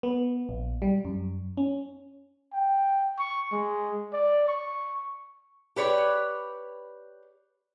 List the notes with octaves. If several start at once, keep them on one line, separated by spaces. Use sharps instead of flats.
B3
A#1
G3
F#2
C#4
G5
C#6
G#3
D5
C#6
G4 B4 C#5 D5